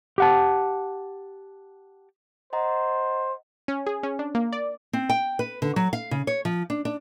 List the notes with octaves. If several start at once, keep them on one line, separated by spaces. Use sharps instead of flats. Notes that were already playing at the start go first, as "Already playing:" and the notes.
G4 F#5 A5
C5 D#5 F#5 A#5
C#4
G#4
C#4
D4
A#3
D5
C4
G5
B4
D3
F#3
F5
C#3
C#5
F3
D4
D4